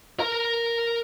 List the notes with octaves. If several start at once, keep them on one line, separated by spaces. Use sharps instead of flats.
A#4 A#5